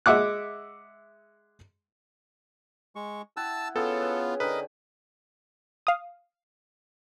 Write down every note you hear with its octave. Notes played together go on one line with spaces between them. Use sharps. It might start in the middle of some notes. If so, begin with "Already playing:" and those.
G#3 E5 F#5 D6 F#6
G#3 C#6
E4 F#5 G5 A5 E6
B3 C#4 F4 G#4 A4 G5
B4
D3 A#4 B4 D#5 G5
F5 D#6